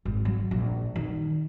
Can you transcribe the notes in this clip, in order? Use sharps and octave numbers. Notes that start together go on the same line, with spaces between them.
G#1
F#3
A#1
D#3